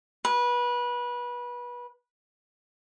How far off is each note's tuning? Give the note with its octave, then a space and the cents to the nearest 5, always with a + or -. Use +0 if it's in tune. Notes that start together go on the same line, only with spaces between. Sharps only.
B4 -25